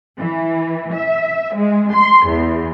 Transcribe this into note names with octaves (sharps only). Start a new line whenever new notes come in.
E3
E5
G#3
C6
E2